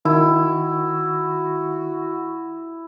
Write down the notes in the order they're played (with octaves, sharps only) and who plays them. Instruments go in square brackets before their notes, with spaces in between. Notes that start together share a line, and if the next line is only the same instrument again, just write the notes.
[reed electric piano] D#3 [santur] E4 [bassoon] F#4